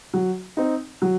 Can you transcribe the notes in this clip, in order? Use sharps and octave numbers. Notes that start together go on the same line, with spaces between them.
F#3
C4 D#4
F#3